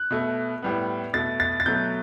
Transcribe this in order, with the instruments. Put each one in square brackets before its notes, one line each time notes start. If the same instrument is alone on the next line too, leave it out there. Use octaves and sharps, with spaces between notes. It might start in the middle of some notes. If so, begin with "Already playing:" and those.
Already playing: [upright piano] F#6
B2 A3
A2 G3 B3
B2 A3 A6
A6
A6
B2 F#3 A3 G6